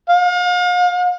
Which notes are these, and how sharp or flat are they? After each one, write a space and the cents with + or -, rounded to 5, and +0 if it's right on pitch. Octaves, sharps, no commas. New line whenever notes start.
F5 +40